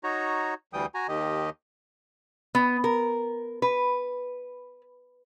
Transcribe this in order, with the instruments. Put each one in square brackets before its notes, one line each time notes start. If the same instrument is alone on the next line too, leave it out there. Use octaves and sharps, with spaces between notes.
[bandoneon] D#4 F#4 C#5 A#5
D2 E3 G3 G5 D#6
F#4 G#5 A#5
D#2 D#3 G4 D#5
[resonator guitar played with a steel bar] B3
A#4
B4